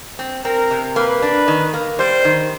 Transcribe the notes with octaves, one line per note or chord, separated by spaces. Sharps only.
C4
C4 A#4
C3
A#3 B4
D4
D#3
A#3
G3 C5
D#3